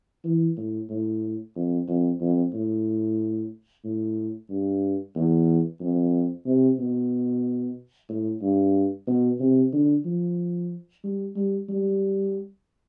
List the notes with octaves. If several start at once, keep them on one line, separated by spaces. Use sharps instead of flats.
E3
A2
A2
F2
F2
F2
A2
A2
G2
E2
F2
C3
B2
A2
G2
B2
C3
D3
F3
G3
G3
G3